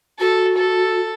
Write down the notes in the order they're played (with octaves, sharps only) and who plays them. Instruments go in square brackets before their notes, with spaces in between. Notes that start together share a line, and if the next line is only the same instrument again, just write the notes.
[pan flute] F#4 [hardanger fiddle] A4
[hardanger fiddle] A4